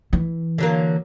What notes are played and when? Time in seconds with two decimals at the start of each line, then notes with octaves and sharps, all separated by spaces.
0.13 E3
0.58 D3 F#3 A#3